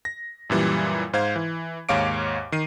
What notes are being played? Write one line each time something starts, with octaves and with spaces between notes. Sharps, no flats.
A#6
F#2 A#2 E3 G3
G#2 C5 F5 G#6
E3
D#2 G#2 C#5 F5 D6 D7
D#3 C7 D#7